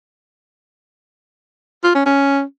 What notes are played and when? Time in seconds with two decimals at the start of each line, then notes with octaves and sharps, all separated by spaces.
1.84 F4
1.95 C#4
2.06 C#4